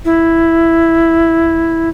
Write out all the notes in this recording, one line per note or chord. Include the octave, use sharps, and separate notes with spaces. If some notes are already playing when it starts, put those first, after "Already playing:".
E4